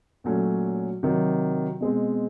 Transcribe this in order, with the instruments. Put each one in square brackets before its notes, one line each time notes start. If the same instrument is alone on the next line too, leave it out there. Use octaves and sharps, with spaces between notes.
[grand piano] A#2 F#3 A3 C#4
C3 D#3 F#3
B2 G#3 C4